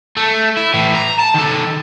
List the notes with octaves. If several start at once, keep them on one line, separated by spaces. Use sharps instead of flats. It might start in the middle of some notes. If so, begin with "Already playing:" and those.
A3
E4
A2 E3
A#5
A5
D#3 A4